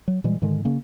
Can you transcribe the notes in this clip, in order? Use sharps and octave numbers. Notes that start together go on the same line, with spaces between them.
F#3
A#2 E3 G3 G#3
G#2 D3 D#3 G#3
C#3 A#3 C#4